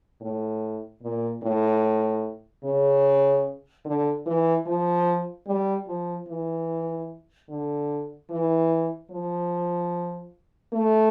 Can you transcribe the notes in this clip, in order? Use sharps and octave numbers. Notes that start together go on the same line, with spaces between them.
A2
A#2
A2
C#3
D3
E3
F3
G3
F3
E3
D3
E3
F3
A3